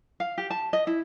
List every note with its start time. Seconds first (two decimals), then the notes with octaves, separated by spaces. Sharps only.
0.20 F5
0.38 G4
0.50 A5
0.73 D#5
0.87 E4